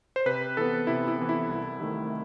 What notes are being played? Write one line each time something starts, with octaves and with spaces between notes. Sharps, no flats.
C5
C3 B4
E3 B3 A4
C3 E4
E4
E3 B3
E4
C2
C3 D#3 A3